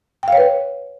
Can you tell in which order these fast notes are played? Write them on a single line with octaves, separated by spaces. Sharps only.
G5 F5 C#5 B4